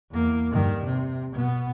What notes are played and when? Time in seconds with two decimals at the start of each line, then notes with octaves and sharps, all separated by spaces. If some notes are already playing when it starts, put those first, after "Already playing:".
0.12 E2 A#3
0.51 G2 D#3
0.85 C3
1.33 B2 B3